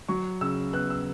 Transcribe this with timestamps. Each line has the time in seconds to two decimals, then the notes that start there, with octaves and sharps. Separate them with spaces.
0.09 F#3 C#6
0.41 C#3 E6
0.73 B3 F#6
0.90 E6